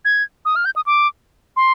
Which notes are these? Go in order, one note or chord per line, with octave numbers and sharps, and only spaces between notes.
G#6
D#6
F6
G6
D#6
D6
C6